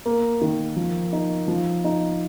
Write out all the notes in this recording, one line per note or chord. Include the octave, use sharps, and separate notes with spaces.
A#3
D#3
F3
D#4
F3
D#4